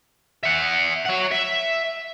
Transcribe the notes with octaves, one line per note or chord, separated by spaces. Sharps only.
E5 F#5
C#5 F#5
E5